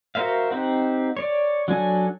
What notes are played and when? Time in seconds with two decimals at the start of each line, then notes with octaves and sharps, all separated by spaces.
0.15 F#4 A#4 C5 E5 F5
0.51 C4 D#4 G4 C5 F#5
1.17 C#5 D5
1.68 F#3 D4 F#4 A4 G#5